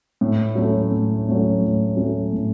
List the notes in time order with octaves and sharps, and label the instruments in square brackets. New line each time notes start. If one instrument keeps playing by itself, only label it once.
[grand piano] A2
F#3 A3 C#4
A2
F#3 A3 C#4
A2
F#3 A3 C#4
A2